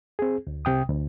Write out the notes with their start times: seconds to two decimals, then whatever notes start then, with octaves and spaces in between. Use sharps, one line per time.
0.19 C4 G#4
0.47 D2
0.65 C2 C3 G5 D#6
0.89 D2